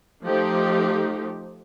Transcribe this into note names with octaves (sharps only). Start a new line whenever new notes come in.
F3 A3 D#4 G4